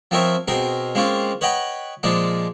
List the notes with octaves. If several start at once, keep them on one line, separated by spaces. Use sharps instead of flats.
F3 C4 D#4 A#4 C#5 E5
B2 C4 D#4 G#4 A#4
G#3 A#3 C4 C#4 F4
B4 C#5 D#5 F#5 G5 B5
A#2 F3 G#3 D4 D#4